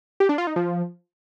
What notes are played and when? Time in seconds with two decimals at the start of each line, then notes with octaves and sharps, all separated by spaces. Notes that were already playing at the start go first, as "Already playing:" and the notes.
0.20 G4
0.29 D4
0.38 F4
0.47 D#4
0.56 F3